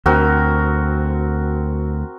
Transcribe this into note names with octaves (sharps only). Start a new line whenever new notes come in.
D2 C4 F#4 A#4